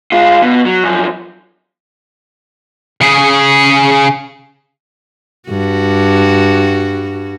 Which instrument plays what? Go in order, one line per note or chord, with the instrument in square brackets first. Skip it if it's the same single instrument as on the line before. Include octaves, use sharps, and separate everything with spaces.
[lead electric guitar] G#3 F4
B2
F#3
F#2 F3
C#3 G#4
[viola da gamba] G2 F#4